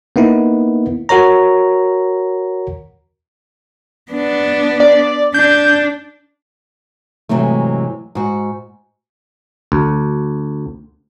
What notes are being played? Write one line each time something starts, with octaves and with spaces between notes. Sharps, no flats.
A#3 B3 D#4 E4
F#4 A#4 C#5 A#5
B3 D4
D5
D4 G6
G#2 C3 E3 F#3 A3
G#2 F#4
D2